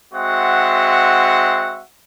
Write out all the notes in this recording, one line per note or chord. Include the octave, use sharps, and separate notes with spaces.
G#3 C4 F#4 E5 F#5